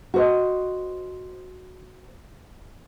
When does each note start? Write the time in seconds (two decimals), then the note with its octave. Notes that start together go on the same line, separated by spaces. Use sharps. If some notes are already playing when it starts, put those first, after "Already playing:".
0.14 F#4 C5 D#5